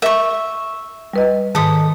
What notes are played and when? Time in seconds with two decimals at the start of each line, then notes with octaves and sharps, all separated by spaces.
0.02 A#4 E5 C#6
1.13 G3 B4 D#5
1.55 G#2 D#3 A4 D#6